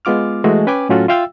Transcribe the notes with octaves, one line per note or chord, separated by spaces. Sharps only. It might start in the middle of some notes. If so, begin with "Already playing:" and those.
G#3 B3 F4 D6 F6
E3 G#3 A3 F#4
C#4 B4 G5 G#5 D6
A2 F#3 C#4 F4 F#4 A4
F4 E5 F5 G5 E6